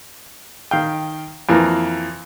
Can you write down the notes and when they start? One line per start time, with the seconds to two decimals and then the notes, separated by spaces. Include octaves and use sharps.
0.71 D#3 F5 G5
1.49 F2 E3 A#3